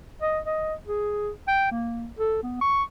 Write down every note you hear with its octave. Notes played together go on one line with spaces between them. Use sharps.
D#5
D#5
G#4
G5
A#3
A4
B3
C#6